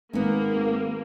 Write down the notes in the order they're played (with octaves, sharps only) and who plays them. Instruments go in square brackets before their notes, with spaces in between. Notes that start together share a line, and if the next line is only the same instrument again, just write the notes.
[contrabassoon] G#1 [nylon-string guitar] G#3 B3 [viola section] A#3